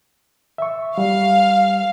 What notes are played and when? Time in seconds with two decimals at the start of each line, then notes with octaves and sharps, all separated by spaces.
0.58 E5 C#6
0.98 G3 F5